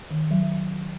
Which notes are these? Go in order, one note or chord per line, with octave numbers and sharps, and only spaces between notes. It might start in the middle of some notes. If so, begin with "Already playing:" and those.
D#3
F#3